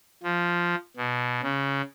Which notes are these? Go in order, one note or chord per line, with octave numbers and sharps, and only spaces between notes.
F3
B2
C#3